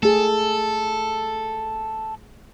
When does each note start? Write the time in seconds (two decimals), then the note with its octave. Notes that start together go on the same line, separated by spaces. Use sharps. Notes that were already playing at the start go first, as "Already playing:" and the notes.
0.03 A3 G#4 A4